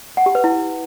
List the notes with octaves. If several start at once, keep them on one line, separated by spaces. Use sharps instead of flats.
F#5
G4
B4
E4